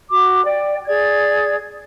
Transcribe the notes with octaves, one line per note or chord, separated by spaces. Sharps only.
F#4 D6
D5 G5
G#4 D5 G#6